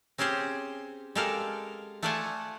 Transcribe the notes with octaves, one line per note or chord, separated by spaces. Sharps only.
C4 C#4 G4 G#4 C5
G#3 G4 A4 A#4 F5
A3 F4 A4 D5 F#5 G#5